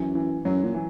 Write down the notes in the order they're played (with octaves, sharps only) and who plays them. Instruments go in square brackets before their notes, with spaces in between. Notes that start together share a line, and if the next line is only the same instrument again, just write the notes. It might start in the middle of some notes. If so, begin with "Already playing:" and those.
Already playing: [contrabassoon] F#2 [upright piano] E3
[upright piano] E3
[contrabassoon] F#2 [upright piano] F#3
[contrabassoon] A#2
[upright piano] E3